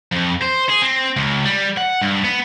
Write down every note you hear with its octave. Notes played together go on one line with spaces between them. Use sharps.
F2
C5
G#4
C4
C#2
G3
F#5
G2
B3